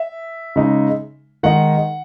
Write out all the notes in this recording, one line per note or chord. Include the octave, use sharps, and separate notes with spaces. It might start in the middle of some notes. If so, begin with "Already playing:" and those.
Already playing: E5
C#3 G#3 D#4
D#3 G#3 D#4 F#5